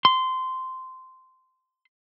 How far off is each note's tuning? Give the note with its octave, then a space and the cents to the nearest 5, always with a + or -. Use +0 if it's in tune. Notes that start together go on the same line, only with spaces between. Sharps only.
C6 -15